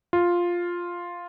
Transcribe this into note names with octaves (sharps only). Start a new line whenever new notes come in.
F4